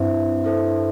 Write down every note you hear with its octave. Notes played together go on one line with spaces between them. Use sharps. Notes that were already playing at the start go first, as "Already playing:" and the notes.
Already playing: G2 C4 E4 C5 E5
E4 A4 C5 E5